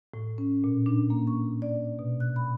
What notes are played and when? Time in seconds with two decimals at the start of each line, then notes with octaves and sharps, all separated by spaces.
0.14 A2
0.38 C#4
0.64 A#2
0.86 D4
1.10 A#3
1.27 C#6
1.62 D5
1.99 B2
2.20 F#6
2.36 B5